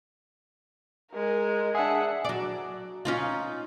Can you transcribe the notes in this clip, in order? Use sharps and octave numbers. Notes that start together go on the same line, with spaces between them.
G#3 A#4
D4 G#4 E5 F#5
F#3 D5
C#4 D#4 F4